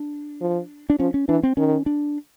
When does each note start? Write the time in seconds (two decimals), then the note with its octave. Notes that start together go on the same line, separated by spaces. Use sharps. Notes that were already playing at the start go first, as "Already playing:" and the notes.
Already playing: D4
0.41 F3
0.90 D4
0.99 F3 C#4
1.14 C#4
1.29 E3 D4
1.43 C4
1.57 D#3 C#4
1.86 D4